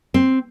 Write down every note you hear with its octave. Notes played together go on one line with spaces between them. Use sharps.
C4